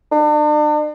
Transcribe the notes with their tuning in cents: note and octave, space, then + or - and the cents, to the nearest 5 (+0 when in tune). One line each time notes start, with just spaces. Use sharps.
D4 +40